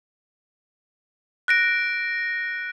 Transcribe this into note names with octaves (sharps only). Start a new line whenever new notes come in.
F#6 A#6 D7